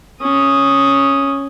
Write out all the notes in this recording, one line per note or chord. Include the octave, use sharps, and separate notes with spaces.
C#4 D#6